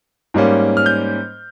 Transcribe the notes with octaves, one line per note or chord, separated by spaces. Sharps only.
G#2 G3 A#3 C#4
F6
G6